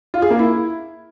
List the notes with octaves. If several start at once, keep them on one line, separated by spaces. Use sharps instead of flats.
F4
G#4
A#3
E4